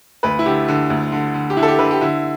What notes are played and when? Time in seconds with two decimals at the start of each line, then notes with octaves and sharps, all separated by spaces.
0.23 D2 B4
0.39 E4
0.46 D3 G4
0.68 D3
0.90 D2
1.12 D3
1.34 D3
1.50 G4
1.57 D3 E4
1.63 A4
1.68 G4
1.79 D3 B4
1.91 G4
2.01 D3 E4